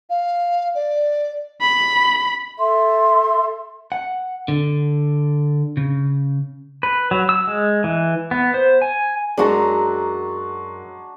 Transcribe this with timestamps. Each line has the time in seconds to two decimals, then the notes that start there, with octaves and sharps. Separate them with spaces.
0.10 F5
0.75 D5
1.62 B5
2.59 A4 E5 C6
3.92 F#5
4.48 D3
5.77 C#3
6.83 B4
7.11 F#3
7.29 E6
7.47 G#3
7.84 E3
8.31 B3
8.54 C5
8.82 G#5
9.37 F#2 F#3 G#3 D4 F#4 A#5